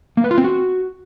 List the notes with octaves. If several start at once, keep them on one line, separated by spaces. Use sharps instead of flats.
A#3
B4
F4
C4
F#4